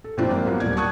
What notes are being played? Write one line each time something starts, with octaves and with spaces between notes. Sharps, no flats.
A4
A#2 E3 F3 C4 D4 F4
G#1 F3 A#3
F#3 A#3 B3
D#1 D5 G#6
A5 C#6 D#6 F#6 G#6